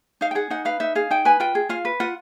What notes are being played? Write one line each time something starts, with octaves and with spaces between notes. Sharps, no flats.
D#4 F5
G5
G#4 F#5
D#4 F#5
B4 F5
D#4 E5
G#4 F5
D#4 G5
B4 G#5
F4 G5
G#4
F4 F5
B4
F4 F#5